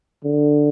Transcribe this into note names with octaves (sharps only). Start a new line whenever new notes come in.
D3